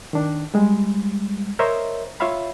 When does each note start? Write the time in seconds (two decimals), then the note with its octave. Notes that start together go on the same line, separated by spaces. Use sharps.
0.13 D#3 D4
0.54 G3 G#3
1.59 A#4 C5 C#5 D#5 E5
2.20 F4 C#5 E5 F5 B5